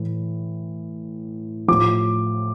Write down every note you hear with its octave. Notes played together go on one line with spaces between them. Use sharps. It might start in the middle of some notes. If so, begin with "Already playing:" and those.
Already playing: A2 E3
A2 F3 D6